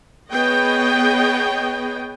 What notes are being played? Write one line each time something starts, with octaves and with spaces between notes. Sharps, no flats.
B3 G#4 B4 C#5 D#5 G5